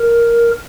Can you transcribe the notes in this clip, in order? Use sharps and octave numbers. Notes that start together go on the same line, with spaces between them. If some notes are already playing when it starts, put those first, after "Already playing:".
Already playing: A#4